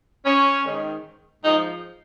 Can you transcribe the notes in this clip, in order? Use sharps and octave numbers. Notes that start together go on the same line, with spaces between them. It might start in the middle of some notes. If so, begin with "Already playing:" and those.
C#4
G#2 D#3
G#2 F3 D#4